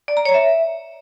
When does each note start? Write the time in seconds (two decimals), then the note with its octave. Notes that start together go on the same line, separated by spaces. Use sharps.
0.08 D5
0.17 A#5
0.25 C#5
0.34 E5